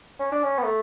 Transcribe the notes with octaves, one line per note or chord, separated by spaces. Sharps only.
C#4
D4
C#4
B3
A3